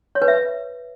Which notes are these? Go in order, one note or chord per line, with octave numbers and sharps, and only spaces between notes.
C#5
B4
E5